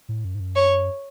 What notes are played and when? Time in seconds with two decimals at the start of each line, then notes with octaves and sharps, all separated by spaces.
0.09 A2
0.25 F#2
0.35 G#2
0.40 F#2
0.56 C#5